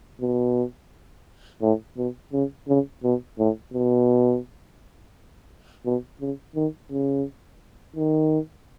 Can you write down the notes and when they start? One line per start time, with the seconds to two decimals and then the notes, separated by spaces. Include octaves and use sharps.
0.21 B2
1.62 A2
1.97 B2
2.33 C#3
2.68 C#3
3.04 B2
3.39 A2
3.74 B2
5.85 B2
6.21 C#3
6.56 D#3
6.91 C#3
7.96 D#3